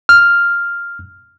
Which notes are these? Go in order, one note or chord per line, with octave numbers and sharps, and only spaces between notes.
F6